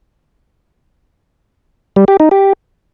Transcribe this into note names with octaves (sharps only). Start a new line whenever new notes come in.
G3
G4
D#4
G4